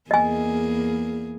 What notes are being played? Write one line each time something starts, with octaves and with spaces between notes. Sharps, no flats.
E2 A#3 G#4 D#5 G#5